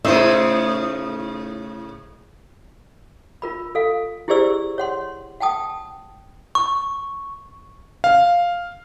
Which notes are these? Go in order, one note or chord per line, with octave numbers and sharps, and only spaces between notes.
A2 C#3 D#4 C5 E5
F4 A#4 B5
A4 F5
E4 G4 G#4 C5 D5 E6
C#5 F#5 C6
F#5 G5 A5 D#6
C#6
F5